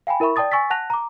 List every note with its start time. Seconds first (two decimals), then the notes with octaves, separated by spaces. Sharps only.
0.07 F5 G5 G#5 B5
0.20 E4 A#4 E5 B5 C#6
0.36 D5 G5 A5 D#6 A6
0.52 G#5 C#6 E6 A6 B6
0.70 F#5 A5 F#6 A#6 F7
0.90 A#5 D6